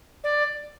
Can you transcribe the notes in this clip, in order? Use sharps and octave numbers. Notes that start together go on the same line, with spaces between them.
D5